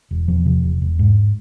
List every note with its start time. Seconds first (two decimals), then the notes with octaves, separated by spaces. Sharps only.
0.11 E1
0.28 E2 F3
0.46 C3
0.63 E1
0.82 E1
0.99 G#2